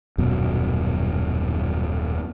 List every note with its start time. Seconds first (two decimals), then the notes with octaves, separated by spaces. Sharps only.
0.18 D#1 F#2 B2